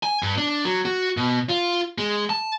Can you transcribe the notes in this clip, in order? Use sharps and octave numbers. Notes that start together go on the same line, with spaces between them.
G#5
G2
D4
F#3
F#4
B2
F4
G#3
A5